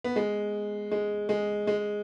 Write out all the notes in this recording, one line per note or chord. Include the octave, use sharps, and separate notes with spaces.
B3
G#3
G#3
G#3
G#3